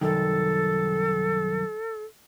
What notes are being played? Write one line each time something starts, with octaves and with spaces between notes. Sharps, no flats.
C2 F#2 D#3 A4